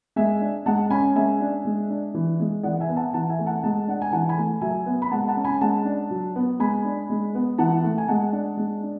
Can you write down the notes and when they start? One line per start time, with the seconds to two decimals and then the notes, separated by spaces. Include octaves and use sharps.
0.16 G#3 E5 G#5
0.41 D4
0.66 G#3 F#5 A5
0.90 C#4 G#5 B5
1.15 G#3 E5 G#5
1.40 D4
1.65 G#3
1.90 D4
2.14 E3
2.40 G#3
2.63 E3 D5 F#5
2.80 E5 G#5
2.89 B3
2.96 F#5 A5
3.13 E3 F#5 A5
3.30 E5 G#5
3.38 A3
3.46 F#5 A5
3.63 G#3 F#5 A5
3.88 D4 F#5
4.02 G#5
4.12 E3 F#5 A5
4.29 G#5 B5
4.37 A3
4.61 F#3 E5 G#5
4.86 B3
5.02 B5
5.11 G#3 F#5 A5
5.28 F#5 A5
5.37 C#4
5.44 G#5 B5
5.61 G#3 F#5 A5
5.85 D4
6.11 F#3
6.36 B3
6.59 G#3 G#5 B5
6.85 D4
7.10 G#3
7.35 B3
7.58 E3 F#5 A5
7.84 A3
7.98 G#5
8.08 G#3 F#5 A5
8.33 D4
8.57 G#3
8.83 D4